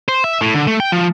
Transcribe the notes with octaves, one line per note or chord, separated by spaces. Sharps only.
C5
E5
A2
D3
A3
G5
F3